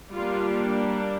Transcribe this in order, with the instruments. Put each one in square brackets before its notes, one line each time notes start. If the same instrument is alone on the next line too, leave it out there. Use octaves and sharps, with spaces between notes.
[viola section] G3 A#3 D4 F4